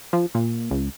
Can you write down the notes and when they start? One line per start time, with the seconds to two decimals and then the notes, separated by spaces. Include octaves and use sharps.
0.13 F3
0.35 A#2
0.71 C#2